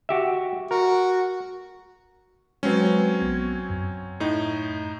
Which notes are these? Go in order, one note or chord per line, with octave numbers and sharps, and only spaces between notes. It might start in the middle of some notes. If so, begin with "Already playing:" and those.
F#4 G4 E5
F#4 A#4
F#3 G#3 C4 C#4 B4
A#1 B3 G#6
F#2
A2 D#4